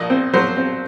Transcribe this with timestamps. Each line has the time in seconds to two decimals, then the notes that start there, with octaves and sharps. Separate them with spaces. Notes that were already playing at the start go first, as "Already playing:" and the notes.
Already playing: A#1 D#5
0.10 C4
0.34 F#3 C5
0.57 C4